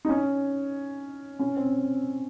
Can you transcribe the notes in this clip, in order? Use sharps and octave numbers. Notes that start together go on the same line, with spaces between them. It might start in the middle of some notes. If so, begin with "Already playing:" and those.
D#4
C#4
C#4
C4